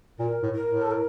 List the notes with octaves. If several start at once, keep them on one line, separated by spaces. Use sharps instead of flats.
A#2 A#4
A2
A#4
A2
A4
A#4